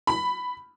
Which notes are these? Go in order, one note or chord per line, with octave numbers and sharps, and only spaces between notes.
B5